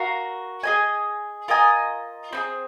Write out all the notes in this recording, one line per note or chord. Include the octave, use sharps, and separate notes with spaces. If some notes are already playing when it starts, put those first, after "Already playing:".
Already playing: F#4 A#4 F5
G#4 D#5 G#5
F4 A#4 D#5 G#5
C4 D#4 G#4